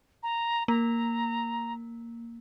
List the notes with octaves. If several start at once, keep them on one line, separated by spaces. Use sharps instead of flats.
A#5
A#3 A#5